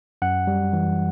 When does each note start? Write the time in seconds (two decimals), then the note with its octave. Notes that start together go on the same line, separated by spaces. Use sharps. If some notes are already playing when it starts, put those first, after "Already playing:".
0.22 F#2 F#5
0.47 G3
0.73 E3